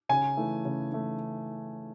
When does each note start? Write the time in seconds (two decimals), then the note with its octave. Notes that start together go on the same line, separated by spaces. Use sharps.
0.09 C#3 G#5
0.37 E3 A3
0.65 C#3
0.92 E3 A3